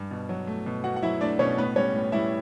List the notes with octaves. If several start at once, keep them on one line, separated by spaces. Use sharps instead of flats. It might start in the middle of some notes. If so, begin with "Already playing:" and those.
Already playing: G2
B2
F#3
A3
B2
B2 F#4 F#5
F#5
F#3 E4 E5
A3 D4 D5
B2 C#4 C#5
A2 B3 B4
G3 C#4 C#5
A2
G3 E4 E5